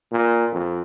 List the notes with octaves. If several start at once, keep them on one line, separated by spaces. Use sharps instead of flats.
A#2
F2